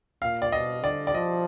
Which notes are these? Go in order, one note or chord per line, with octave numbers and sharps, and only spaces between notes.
A#2 F5
D5
B2 D#5
D3 D5
D5
F3 D#5